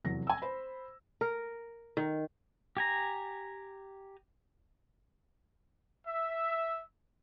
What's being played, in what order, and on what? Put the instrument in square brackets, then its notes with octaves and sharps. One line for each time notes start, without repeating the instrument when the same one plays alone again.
[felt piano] F1 E2 F#3 A#6
G#5 E6
C5 B5
[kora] A#4
D#3
[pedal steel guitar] G4 G#5 A#5
[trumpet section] E5